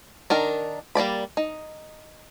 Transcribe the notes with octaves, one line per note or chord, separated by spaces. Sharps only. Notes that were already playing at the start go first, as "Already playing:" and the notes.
D#3 D4 A#4
G3 A#3 D5 B5
D#4